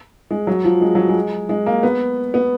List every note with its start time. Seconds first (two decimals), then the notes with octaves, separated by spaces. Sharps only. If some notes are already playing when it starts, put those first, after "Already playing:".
0.31 G#3
0.47 F#3
0.65 F3
0.81 G#3
0.95 F#3
1.08 G#3
1.49 G#3
1.66 A#3
1.83 B3
2.34 B3